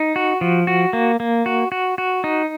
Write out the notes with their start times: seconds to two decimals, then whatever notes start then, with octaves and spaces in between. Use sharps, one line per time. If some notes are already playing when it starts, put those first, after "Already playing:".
Already playing: D#4
0.16 F#4
0.41 F3
0.67 F#4
0.93 A#3
1.20 A#3
1.46 F#4
1.72 F#4
1.98 F#4
2.24 D#4